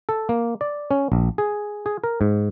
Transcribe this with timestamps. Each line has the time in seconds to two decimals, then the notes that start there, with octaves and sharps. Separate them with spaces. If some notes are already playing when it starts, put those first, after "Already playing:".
0.09 A4
0.29 A#3
0.61 D5
0.91 C#4
1.12 A#1
1.38 G#4
1.86 G#4
2.04 A#4
2.21 G#2